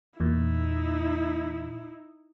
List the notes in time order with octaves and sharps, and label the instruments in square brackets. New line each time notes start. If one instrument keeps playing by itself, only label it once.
[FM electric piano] E2 A#2 [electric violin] D#4 E4